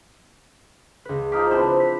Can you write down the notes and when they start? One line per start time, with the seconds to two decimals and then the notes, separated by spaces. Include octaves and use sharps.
1.05 C#2 B4
1.32 F3 D#4 D6 F6 B6
1.51 C4 D4 E4 B4 C5 E5
1.80 B6